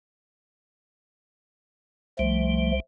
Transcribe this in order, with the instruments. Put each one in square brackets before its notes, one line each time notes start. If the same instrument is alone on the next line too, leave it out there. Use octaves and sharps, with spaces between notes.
[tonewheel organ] C2 G3 [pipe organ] F3 A3